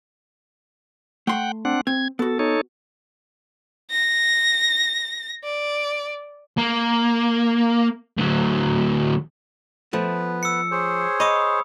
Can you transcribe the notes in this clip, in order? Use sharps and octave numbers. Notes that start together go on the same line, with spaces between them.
A3 F#5 G5 C6
C4 D4 F#5
C4 G#6
B3 F#4 A4
D#4 A4 C#5
A#6
D5
A#3
D2 F#3
F3 A3 B3 B4
E6 C#7
G#4 C5 C#5
D#5 B5 C#6 D#6